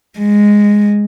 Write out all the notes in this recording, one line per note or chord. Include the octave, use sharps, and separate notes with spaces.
G#3